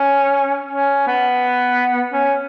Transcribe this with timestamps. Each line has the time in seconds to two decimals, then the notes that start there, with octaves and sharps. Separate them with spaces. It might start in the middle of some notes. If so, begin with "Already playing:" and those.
Already playing: C#4
0.71 C#4
1.07 B3
2.13 C#4